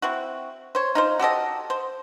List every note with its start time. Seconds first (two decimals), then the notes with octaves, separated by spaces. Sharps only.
0.02 C4 E4 F#4
0.75 C5 C#5
0.95 D#4 F4 C5
1.19 F#4 G4 A4 D#5
1.70 C5